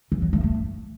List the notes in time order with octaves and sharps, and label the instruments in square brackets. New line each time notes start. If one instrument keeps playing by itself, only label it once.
[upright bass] E3
F#3
A3
A3